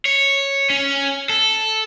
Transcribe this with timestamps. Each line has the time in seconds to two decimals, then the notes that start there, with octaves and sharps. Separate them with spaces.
0.05 C#5
0.70 C#4
1.30 A4